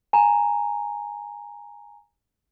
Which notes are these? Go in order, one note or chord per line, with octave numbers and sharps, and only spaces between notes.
G#5 A#5